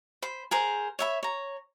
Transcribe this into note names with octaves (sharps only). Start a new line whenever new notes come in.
C5 B5
G#4 A#4 C5
C#5 E5 B5
C#5 A#5